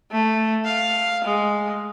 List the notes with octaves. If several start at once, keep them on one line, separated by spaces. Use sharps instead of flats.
A3
F5
G#3